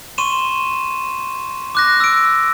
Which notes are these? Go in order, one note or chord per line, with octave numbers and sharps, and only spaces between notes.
C6 C#6 D#7 E7
D6 F#6 A#6
E6 D7